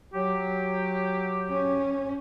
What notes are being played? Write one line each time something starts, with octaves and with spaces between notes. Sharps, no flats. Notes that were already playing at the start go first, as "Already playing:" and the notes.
F#3 G4
C#4